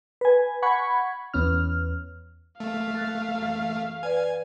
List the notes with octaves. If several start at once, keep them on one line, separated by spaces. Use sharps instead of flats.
B4 G#5
F#5 B5 C#6 G#6
E2 B3 C#4 F6
A3 F5
F#6 A6
F#2 E3
B4 D5 G#5